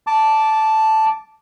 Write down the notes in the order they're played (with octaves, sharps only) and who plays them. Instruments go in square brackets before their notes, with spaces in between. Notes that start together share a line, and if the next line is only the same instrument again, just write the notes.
[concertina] A5 D6